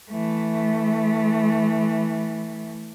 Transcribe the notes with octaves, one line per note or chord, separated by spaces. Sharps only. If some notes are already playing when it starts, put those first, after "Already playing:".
E3 A3